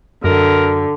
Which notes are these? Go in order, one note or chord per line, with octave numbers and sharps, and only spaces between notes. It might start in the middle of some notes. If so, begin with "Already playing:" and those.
F#2 D3 A#4